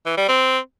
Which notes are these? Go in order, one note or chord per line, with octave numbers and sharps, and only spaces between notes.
E3
G3
C4